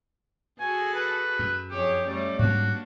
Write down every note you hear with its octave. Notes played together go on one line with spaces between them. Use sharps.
F#4 G#4 A4 G#5
B4
F#2
F2 G4 G#4 C#5
G3 A3 C#4 D5
G#2 G3 A#3 C4 D4 F#4